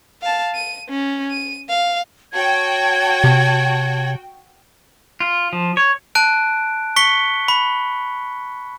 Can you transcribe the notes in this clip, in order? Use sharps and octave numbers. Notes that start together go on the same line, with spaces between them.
F5 A5
D#7
C#4
D#7
F5
F#4 C#5 G5 A5 G#6
C3
F4
F3
C#5
A5 F#6 D7
C#6 B6 C#7 G7
B5